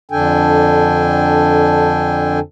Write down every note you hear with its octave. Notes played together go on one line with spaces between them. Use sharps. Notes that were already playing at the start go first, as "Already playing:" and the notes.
F2 D3 D4 A4 G5 G#5